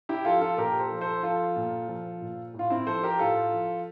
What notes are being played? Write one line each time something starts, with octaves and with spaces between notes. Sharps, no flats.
E4 G4
F3 F4 A4
F4 A4
A#2 G4 A#4
A4 C5
F3
A4 C5
F3 F4 A4
A#2
F3
A#2
A2
F4
C4 E4
F3 A4 C5
G4 A#4
A2 F4 A4
F3